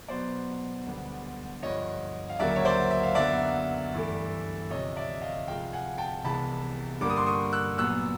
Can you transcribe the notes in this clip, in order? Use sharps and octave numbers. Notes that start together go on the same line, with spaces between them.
B2 F#3 B3 C5 D5
D2 D3 G3 B3
G2 D3 F3 C#5 D#5
F5
D2 C#3 F#3 A#3 D5 E5
C#5
C5 D5
E5
F5
F#2 D3 F#3 B3 D5 E5
G2 E3 A3
D2 C3 F3 C#5 D#5
D5 E5
D#5 F5
C2 C3 F3 G#3 F5 G5
F#5 G#5
G5 A5
C2 C3 E3 G#3 B3 A5 B5
G2 D3 G3 A#3 D6
D#6
C6 D6
C#6 D#6
E6 F#6
A#2 F#3 B3 E6 F#6